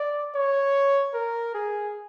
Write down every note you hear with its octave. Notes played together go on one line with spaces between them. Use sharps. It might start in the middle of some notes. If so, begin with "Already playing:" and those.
Already playing: D5
C#5
A#4
G#4